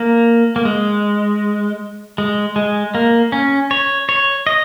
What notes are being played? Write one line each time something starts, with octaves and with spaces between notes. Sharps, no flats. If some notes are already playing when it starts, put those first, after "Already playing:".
Already playing: A#3
A#3
G#3
G#3
G#3
A#3
C#4
C#5
C#5
D#5